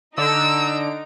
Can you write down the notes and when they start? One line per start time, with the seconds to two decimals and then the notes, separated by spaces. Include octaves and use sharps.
0.18 D3 D#4 E6 D7